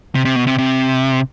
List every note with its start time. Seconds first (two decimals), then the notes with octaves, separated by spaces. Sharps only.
0.15 C3
0.25 C3
0.36 B2
0.47 C3
0.58 C3